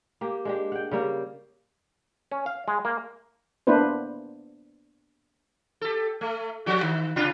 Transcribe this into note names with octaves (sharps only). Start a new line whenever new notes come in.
A#3 G4
G#3 D4 G4
F#5 G5
C#3 G3 A#3
C#4
F5
G#3
A#3
A#3 B3 D4 E4 B4 C5
G4 A4
A3
F3 F#4 G4
D#3
C3 D4 F4